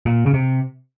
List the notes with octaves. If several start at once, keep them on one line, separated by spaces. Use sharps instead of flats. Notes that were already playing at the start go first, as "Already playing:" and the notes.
A#2
C#3
C3